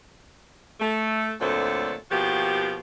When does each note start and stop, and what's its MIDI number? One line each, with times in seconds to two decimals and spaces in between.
0.80 1.33 57
1.41 1.95 38
1.41 1.95 46
1.41 1.95 54
1.41 1.95 57
1.41 1.95 60
1.41 1.95 69
2.11 2.80 47
2.11 2.80 53
2.11 2.80 58
2.11 2.80 66
2.11 2.80 67